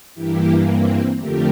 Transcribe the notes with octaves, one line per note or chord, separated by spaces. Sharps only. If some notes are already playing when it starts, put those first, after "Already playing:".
G2 E3 A#3 E4 G4
C4
F2 D3 F3 A3 G4 A#4